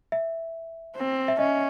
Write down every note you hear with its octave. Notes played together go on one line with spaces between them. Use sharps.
E5
C4
E5
C#4 D#5